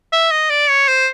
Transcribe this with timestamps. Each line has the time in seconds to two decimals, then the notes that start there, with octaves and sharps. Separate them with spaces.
0.12 E5
0.31 D#5
0.50 D5
0.69 C#5
0.88 C5